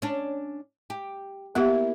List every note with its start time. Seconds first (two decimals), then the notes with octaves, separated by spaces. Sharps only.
0.02 C#4 D4
0.90 G4
1.55 A#3 B3 E4 G4